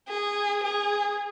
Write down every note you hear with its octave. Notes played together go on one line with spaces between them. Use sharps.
G#4
G#4